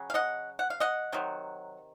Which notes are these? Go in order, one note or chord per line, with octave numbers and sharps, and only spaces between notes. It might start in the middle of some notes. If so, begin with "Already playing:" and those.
Already playing: C#3 F#3
F5
D#5 F#5
F#5
F5
D#5 F#5
C3 D#3 F#3